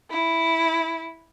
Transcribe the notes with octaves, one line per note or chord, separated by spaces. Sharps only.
E4